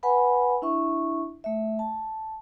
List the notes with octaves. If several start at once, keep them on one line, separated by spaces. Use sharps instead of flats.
B4 F#5 G#5 B5
D4 E4 E5 C#6
A3 E5
A5